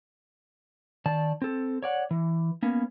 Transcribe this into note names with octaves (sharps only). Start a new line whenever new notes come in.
D#3 D5 A5
C4 A4
C#5 D5 F#5
E3
A#3 B3 C#4